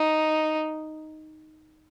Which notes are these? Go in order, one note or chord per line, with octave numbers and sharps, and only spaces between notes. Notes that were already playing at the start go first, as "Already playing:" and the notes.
Already playing: D#4